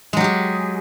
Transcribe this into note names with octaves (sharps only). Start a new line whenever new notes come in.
F#3 G#3 G4 G#4